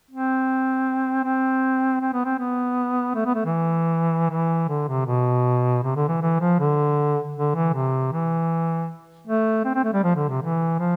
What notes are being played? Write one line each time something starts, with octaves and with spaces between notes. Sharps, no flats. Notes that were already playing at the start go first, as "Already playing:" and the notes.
C4
C4
C4
B3
C4
B3
A3
B3
A3
E3
E3
D3
C3
B2
C3
D3
E3
E3
F3
D3
D3
E3
C3
E3
A3
C4
C4
A3
G3
F3
D3
C3
E3
F3